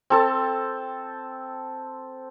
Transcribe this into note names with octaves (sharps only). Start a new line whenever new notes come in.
C4 A4 A5